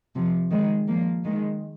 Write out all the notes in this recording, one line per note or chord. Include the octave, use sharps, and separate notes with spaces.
C3 F3
D#3 G#3
F3 A#3
D#3 G#3